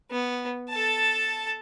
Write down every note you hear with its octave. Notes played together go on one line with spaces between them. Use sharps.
B3
A4 A5